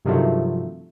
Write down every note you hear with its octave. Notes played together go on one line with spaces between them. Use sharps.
G2 C3 D#3 F3 F#3 A3